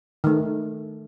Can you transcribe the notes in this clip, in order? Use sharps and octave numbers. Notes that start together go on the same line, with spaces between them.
D#3 A3